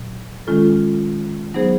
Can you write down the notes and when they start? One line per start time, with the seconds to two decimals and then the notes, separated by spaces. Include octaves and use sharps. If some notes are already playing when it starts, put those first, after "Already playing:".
Already playing: A#2 F#3
0.47 D#3 G#3 C#4 F4 A4
1.54 F#3 B3 D#4 G#4 C5